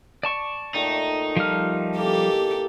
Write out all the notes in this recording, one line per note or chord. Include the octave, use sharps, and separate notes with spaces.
D5 A5 C#6
A#2 D#3 A3 D#4
F3 G3 F6
E3 A#3 G4 A4